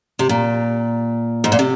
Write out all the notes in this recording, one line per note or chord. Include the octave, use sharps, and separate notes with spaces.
C3
A#2
G#2
A#2
C3